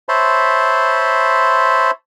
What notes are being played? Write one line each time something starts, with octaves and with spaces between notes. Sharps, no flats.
C5 C#5 E5 A5 B5 C6